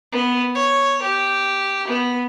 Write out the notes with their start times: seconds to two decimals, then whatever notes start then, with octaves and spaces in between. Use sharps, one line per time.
0.12 B3
0.55 C#5
1.02 G4
1.87 B3